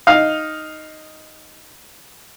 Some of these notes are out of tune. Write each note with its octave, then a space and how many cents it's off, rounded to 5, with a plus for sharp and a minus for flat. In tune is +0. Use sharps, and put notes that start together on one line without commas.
D#4 +0 F5 +5